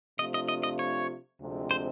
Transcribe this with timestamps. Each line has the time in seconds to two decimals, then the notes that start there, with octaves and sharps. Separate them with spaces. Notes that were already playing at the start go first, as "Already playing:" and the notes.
0.18 C3 F3 A3 D4 F4 D#5
0.34 D#5
0.48 D#5
0.63 D#5
0.79 C#5
1.40 D2 C3 F3 G#3 C4
1.71 C5